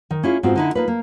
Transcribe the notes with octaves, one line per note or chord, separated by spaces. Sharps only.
D#3
C#4 E4 F4 G#4
G#2 B3 C4 F4 F#4
D3 D#4 E4
A#3 D#4 F4 B4
A#3